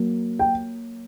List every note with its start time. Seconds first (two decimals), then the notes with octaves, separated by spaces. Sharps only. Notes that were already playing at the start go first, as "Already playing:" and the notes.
Already playing: F#3 A#3
0.39 G5